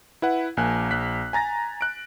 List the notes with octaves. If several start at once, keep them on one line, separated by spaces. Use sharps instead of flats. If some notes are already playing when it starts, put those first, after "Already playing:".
E4 B4 F#5
A#1 A#3 G#5 F#6
A#1 F#6 B6
G#5 A#5 A6 A#6
F#6 D7